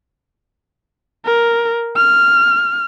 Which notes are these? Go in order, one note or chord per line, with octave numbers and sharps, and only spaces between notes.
A#4
F6